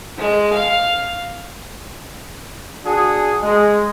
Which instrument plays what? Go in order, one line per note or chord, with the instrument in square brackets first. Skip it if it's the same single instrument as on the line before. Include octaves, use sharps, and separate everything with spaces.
[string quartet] G#3
F5
[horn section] D4 F#4 G#4
G#3